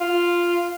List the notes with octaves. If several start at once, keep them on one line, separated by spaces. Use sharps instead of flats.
F4